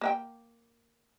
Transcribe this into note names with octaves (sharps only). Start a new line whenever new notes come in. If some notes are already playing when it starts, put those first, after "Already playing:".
A#3 E5 G5